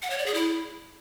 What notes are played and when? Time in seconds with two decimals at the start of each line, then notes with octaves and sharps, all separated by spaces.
0.02 F#5
0.10 C#5
0.18 D5
0.26 G#4
0.34 E4